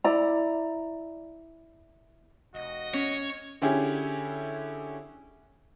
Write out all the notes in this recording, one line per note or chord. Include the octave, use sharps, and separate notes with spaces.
E4 D5 A#5
F1 F#4 D#5
C#4 C#5
D3 C#4 E4 G4 G#4